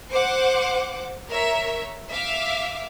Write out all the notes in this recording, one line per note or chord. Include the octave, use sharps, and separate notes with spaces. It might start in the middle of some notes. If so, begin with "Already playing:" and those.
C5 F#5 D6
A#4 C#5 E5
E5 F5 D6